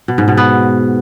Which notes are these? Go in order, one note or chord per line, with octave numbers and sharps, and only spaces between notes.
B2
G#2
B2
B3